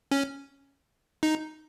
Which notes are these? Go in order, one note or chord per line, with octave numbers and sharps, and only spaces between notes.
C#4
D#4